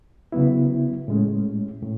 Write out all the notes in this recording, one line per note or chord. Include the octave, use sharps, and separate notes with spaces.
C#3 F#3 B3 E4
A2 G#3 C#4
A2